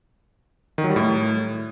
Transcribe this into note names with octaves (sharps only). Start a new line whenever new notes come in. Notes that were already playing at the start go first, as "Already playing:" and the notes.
D#3
F#3
G3
A2